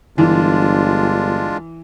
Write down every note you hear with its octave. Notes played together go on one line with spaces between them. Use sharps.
G1 E3 G#3 D4 F4